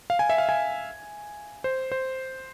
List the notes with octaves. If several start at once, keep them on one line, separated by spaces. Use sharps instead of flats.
F5
G#5
E5
F5
G#5
C5
C5